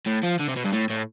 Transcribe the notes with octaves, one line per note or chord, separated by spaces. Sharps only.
A2
F3
D3
C3
B2
G2
A2
A2